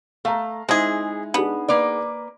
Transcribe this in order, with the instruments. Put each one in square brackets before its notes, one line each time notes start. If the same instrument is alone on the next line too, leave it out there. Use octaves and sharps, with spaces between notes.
[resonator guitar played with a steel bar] A3 [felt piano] F5 A#5
[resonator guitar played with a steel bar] G#3 D#5 [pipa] C4 G#4 [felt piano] D#4 E4
[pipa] B3 [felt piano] D4 D#4 G#4
[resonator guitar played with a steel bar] A#3 B4 D5